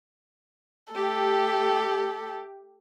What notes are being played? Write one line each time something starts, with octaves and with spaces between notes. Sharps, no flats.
A3 G4 A4